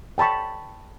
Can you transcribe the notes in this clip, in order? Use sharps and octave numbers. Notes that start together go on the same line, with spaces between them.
G5 A5 B5 C#6